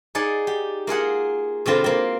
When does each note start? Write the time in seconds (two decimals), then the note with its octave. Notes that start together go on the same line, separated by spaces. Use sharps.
0.15 D#4 G#4 D5 F#5
0.47 G4
0.87 A#3 F4 G#4 F#5
1.66 B2 D3 C4 F4
1.84 A#3 C4